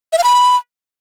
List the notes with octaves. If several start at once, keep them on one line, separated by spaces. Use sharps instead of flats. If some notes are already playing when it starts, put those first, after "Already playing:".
E5
F5
B5